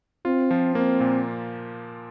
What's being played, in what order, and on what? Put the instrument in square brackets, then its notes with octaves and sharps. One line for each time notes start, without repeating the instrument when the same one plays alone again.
[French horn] C4 [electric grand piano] F4
[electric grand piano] F3
[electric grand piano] A#3 [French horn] C4
[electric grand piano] A#2